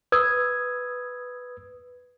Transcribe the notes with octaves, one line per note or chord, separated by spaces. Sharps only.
B4 D#6 E6 G#6